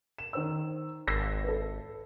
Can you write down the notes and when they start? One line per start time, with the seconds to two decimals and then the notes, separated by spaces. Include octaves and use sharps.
0.18 E7
0.33 D#3 C5 E6
1.07 G#1 E6 A#6 C7
1.44 A4 B4